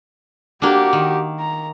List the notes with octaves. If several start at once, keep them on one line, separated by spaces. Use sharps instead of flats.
A#3 D4 F#4 G4
D#3
A#5